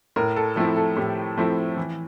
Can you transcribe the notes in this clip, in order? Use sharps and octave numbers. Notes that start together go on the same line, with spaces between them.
A2 A#4
A4
F3 A3 C4 E4 A4
A4
A2 G4
F3 A3 C4 E4
E3